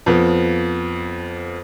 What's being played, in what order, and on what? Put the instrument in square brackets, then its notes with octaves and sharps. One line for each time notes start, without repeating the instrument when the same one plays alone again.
[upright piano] F2 F3 B3